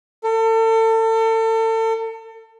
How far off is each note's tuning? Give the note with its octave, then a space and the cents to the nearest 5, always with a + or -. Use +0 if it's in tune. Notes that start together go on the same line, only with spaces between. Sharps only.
A4 +35